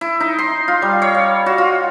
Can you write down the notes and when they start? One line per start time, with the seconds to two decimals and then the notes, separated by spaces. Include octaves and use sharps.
0.01 E4
0.20 D#4
0.39 C6
0.68 F4
0.82 G3
1.02 C#5
1.15 F5
1.46 F#4
1.58 F4